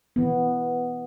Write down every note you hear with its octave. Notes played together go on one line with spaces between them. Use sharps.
E3 B3